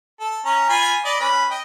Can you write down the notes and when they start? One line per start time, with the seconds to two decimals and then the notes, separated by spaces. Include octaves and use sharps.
0.20 A4
0.45 C#4 A#5
0.69 F4 G#5 B5
1.05 D5 D#5 B5
1.20 C#4 B4 B5
1.50 D#5 G5